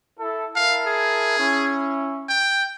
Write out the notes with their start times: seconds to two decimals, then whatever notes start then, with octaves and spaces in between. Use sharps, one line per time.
0.20 E4 A4
0.56 E4 A#4 F5 A5
0.87 G#4
1.39 C#4 E4
2.29 G5